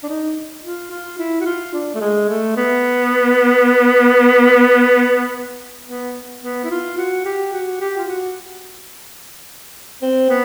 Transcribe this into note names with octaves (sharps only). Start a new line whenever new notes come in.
D4
D#4
F4
F4
E4
F#4
F4
D4
A3
G#3
A3
B3
B3
B3
E4
F4
F#4
G4
F#4
G4
F4
F#4
C4
B3